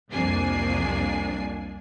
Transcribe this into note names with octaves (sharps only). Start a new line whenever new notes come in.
C2 F2 A#3 D4 G#5 C7